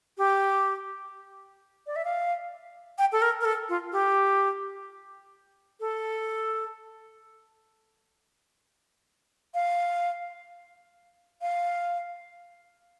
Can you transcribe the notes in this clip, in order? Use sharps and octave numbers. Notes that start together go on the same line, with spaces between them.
G4
D5
E5
F5
G5
A4
A#4
A#4
A4
F4
G4
A4
F5
F5